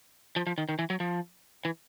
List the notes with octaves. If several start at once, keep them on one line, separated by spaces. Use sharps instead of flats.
F3
F3
D#3
D#3
E3
F#3
F3
E3